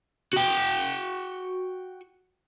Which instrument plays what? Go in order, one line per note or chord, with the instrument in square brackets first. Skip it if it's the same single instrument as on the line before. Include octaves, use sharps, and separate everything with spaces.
[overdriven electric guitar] F#4 G5